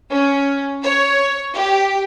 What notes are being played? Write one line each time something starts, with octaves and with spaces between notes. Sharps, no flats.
C#4
C#5
G4